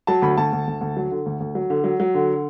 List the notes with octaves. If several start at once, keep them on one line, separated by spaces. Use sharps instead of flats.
F#3 A5
D2 B5
D2 A5
D2
D2
D2
F#3
D3
D2
D2
F#3
D3
F#3
F#3
D3